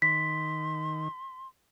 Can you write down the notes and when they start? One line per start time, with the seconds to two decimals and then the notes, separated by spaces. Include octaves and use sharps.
0.02 D#3 C6 B6